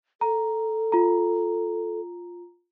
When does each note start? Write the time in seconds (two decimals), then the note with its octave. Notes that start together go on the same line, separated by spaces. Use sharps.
0.21 A4 A#5
0.92 F4 A#5